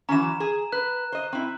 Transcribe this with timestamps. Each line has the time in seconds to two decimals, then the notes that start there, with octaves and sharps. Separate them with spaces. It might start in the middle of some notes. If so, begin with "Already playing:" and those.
0.09 E3 F#3 C#4 A#5 E7
0.40 G#4
0.72 B4 F#6
1.12 C5 D#5
1.33 C4 E4